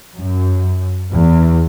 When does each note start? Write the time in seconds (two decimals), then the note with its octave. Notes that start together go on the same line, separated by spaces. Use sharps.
0.19 F#2
1.12 E2